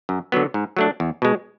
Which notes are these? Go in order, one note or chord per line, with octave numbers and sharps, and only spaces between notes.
F#2
D3 F#3 B3
G#2
F#3 A3 D4
E2
B2 G#3